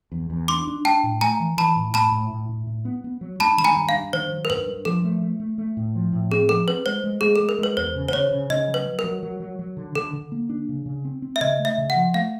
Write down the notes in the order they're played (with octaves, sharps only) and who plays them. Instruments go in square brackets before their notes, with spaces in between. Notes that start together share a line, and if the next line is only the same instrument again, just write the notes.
[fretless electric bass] E2
E2
[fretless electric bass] D4 [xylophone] C6 D6
[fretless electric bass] D4
[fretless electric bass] D4 [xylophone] G5 A5
[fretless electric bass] A2
[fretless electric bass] A3 [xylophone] G#5 A#5
[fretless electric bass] E3
[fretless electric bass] E3 [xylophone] A5 B5
[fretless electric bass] A2
[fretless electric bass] A2 [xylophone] A5 B5
[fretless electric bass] A2
A2
A2
A2
B3
B3
F#3
[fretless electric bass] G2 [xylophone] A5 B5
[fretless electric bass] D#3 [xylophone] B5
[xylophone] G#5 A#5
[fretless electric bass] G2
[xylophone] F5
[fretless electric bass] G2
[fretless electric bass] D#3 [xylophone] C5
[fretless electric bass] F#3
[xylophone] A#4
[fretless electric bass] G2 [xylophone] B4
[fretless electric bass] G2
[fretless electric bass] F3 [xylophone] A4
[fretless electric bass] A3
A3
A3
A3
A2
F3
A2
[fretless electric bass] C4 [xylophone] G#4
[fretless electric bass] F3 [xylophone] A4
[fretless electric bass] C4 [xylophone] B4
[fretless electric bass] G#3 [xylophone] C5
[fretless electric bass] G#3
[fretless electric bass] G#3 [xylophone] G#4
[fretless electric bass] G#3 [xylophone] A4
[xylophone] A#4
[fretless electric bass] G#3 [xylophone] B4
[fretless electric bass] E2 [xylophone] C5
[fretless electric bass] C#3
[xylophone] C5
[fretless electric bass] C#3 [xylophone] C#5
[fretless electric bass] C#3
[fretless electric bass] C#3 [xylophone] D#5
[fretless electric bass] F#3
[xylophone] B4
[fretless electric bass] F#3
[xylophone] A#4
[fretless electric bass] F#3
F#3
F#3
F#3
D3
[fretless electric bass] D3 [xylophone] A4
[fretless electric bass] D3
A#3
D4
C#3
C#3
C4
C4
[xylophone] E5
[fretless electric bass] C#3 [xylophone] D#5
[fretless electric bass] A3
[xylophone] E5
[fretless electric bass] C#3
[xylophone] F#5
[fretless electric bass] F3
[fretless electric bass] A3 [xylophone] F5